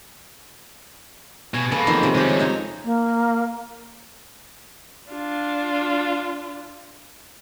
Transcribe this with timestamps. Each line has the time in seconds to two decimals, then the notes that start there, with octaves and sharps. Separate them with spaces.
1.54 B2 G#5
1.72 C#3 A#3 B3 A4
1.87 F2 D#3 C6
2.03 C3
2.15 C#3 G#3 A3 G4
2.39 C4 D#4 C#5
2.84 A#3
5.11 D4 F4